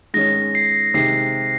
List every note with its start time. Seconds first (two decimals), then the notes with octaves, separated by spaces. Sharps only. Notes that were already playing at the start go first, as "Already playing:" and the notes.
0.14 G#2 D#3 G#3 C#4 A#6
0.55 C7
0.94 C3 D#3 G#3 C7